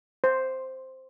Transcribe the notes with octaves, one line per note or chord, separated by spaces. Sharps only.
C5